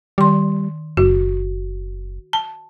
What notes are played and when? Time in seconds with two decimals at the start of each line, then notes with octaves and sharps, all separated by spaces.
0.18 D#3 G3 C6
0.97 F#1 F#4
2.33 A5